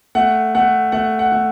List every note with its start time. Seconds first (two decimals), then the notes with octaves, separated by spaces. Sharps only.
0.15 A3 F#5
0.55 A3 F#5
0.92 A3 F#5
1.19 F#5
1.32 A3